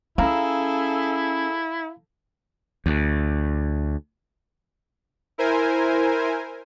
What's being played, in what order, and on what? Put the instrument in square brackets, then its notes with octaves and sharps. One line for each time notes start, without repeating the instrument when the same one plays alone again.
[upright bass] C#4 [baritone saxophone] E4 [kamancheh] G#4 A4 [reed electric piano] F5 A#5
[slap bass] D2
[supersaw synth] E4 A#4 C5 G#5